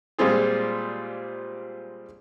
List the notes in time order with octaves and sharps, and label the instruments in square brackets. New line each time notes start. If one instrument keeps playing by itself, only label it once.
[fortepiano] A#2 G3 G#3 C4 F4 G#4